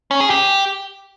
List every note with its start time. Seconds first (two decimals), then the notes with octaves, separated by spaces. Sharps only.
0.11 C#4
0.20 G#4
0.30 G4